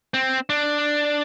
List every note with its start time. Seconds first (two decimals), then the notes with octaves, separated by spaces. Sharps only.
0.14 C4
0.50 D4